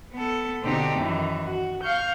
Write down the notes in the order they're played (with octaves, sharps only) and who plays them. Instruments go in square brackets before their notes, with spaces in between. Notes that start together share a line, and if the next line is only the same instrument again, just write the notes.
[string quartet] B3 A4
B2 D3 C4 D4 D#4 G4
F#2 D#3 E3
F#4
F5 C#6 F6 G6